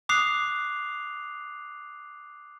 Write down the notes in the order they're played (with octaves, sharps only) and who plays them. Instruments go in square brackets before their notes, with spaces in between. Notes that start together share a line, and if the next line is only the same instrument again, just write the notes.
[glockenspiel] D6 D#6 F#6 C7 F7